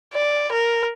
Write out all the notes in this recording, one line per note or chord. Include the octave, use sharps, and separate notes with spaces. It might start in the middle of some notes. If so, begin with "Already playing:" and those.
D5
A#4